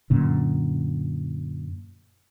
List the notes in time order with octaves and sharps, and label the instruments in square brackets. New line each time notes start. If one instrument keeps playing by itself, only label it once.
[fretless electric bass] F#2 A#2 D3